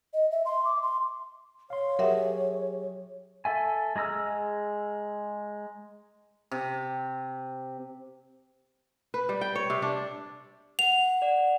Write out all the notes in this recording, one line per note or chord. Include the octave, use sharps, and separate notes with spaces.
D#5
E5
C6
D6
C6
C#5 F5 C6
F#3 G4 G#4 A#4 E5 F#5
A4 E5 G#5
G#3 G#4 A#5 E6 F6
C3
B4
G3
G5
C#5
C3
D4
F#5 F7
D5 F#5